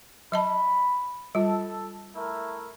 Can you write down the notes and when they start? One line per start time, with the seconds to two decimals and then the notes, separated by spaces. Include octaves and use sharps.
0.32 F#3 D#5 A5 B5
1.35 G3 F4 A4
2.15 A3 E4 A#4